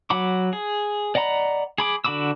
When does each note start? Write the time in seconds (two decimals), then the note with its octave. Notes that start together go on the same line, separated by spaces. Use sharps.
0.10 F#3 F#5 B5 D6
0.53 G#4
1.15 D5 D#5 F#5 A#5 B5
1.78 G#4 B5 D6
2.04 D3 F#4 B5 D6 E6